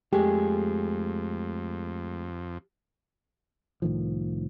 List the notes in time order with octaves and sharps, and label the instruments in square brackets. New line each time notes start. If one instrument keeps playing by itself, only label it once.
[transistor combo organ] F2 [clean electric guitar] G#3 A3 G#4 [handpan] G4
[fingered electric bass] C2 A2 D#3 F3